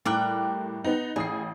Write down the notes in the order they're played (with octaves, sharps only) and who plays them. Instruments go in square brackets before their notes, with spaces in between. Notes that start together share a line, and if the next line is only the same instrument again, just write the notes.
[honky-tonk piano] A2 D6 F#6 [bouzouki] G3 A#4 G5
[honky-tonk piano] B3 D#4
[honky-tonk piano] A1 D#6 C7 [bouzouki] G#4